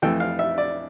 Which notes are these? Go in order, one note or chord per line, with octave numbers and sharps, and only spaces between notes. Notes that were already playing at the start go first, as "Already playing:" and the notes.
F2 E3 A3 G5
F5
E5
D5